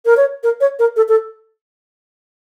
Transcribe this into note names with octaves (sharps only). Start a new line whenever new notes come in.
A#4
C#5
A#4
C#5
A#4
A4
A4